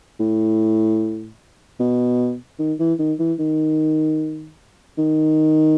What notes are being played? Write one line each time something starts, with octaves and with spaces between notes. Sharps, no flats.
A2
B2
D#3
E3
D#3
E3
D#3
D#3